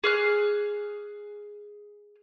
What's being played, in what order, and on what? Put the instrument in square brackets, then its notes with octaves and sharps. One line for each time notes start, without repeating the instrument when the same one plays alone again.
[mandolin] G#4 F6 F#6